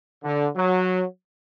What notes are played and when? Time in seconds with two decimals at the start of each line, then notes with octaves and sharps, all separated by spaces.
0.24 D3
0.56 F#3